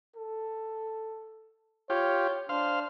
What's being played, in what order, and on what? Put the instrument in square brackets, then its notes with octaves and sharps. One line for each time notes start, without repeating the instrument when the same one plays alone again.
[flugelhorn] A4
[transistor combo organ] F4 G4 [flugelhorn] C#5
[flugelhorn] D4 [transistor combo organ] C5 F5